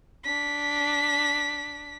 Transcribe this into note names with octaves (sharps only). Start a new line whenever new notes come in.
D4 B6